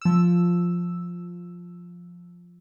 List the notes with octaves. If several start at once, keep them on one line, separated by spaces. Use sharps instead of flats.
F3 E6